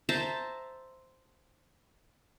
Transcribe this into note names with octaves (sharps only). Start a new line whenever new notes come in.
C5 E5 A5 A#5